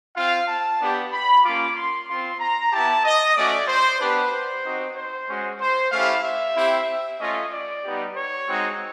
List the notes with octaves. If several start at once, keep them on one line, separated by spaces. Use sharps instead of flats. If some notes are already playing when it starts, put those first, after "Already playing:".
C4 F4 F5
A5
B3 D4 G4
B5
A#3 C#4 F4 D6
C6
C4 F4 C6
A#5
B3 E4 G4 A5
D#5
A3 C#4 F#4 D5
C5
B3 D4 G4 B4
C5
C4 D#4 F#4
C5
G#3 C#4 F#4
C5
A3 C#4 E4 G4 F5
E5
C4 E4 G4
A3 C#4 F4 D#5
D5
G3 B3 D#4 G4
C#5
G#3 C4 D#4 F#4